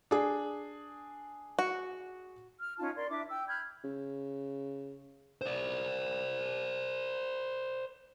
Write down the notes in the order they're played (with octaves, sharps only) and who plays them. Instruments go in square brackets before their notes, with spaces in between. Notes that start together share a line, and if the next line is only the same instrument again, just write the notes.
[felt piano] D4 G#4
[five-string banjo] F#4
[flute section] F6
C#4 D#4 F4 A5
A#4 D5 C6
D4 E4 E5 D6
G5 E6
B5 F6 G6 G#6
[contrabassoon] C#3
[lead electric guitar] C5 D5